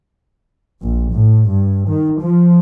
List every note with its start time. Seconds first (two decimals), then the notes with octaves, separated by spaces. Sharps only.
0.82 A#1
1.12 A2
1.50 G2
1.88 D#3
2.21 F3